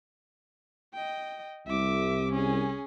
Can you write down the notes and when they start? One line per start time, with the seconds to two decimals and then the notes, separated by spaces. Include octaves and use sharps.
0.94 D#5 G5
1.67 C2 E5 D6
2.33 C#4 G#4